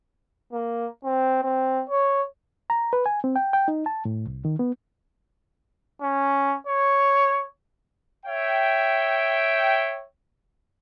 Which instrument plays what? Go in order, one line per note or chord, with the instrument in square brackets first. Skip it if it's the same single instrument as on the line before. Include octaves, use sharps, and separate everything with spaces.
[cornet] A#3
C4
C4
C#5
[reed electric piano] A#5
B4
G#5
C4
G5
G5
D#4
A5
A2
C2
D#3
B3
[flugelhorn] C#4
C#5
[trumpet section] C#5 E5 G5